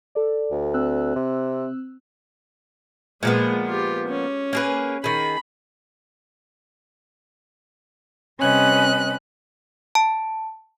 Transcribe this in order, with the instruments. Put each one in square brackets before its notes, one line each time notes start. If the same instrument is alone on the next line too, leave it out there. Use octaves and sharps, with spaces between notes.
[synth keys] A4 D5
[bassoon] D2
[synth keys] C4 E6 F#6
[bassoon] C3
[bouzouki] A#2 F3 B3 [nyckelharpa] G#3
[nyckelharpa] F4 G4
C#4
[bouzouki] A#3 G#4 B4
[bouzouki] D#3 G#4 [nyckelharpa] B5
[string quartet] C3 G3 C#4 B4 D#5 F#6
[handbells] A5